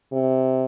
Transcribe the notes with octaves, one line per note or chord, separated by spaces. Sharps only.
C3